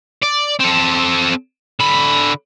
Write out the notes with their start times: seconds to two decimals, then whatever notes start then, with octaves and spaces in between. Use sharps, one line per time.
0.22 D5
0.59 C4 A4
1.80 D3 B5